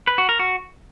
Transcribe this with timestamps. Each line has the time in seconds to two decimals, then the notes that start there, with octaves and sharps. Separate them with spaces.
0.07 B4
0.18 F#4
0.29 A#4
0.39 F#4